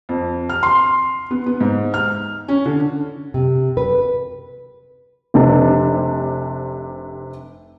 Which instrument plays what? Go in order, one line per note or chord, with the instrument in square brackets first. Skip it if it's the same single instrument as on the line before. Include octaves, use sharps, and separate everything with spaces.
[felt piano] F2
F6
C6
B3
B3
G#2
F6
C#4
D3
[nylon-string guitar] C3
B4
[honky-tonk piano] F1 C3 D4